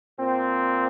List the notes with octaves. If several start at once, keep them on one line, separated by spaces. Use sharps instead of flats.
A#2 C4